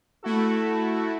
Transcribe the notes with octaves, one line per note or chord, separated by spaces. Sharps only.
A3 E4 F#4 A4